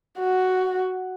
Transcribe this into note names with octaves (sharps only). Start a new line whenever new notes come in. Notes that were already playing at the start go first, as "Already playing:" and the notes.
F#4